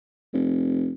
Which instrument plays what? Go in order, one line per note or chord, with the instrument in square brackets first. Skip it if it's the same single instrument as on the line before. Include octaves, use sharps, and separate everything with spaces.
[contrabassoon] F1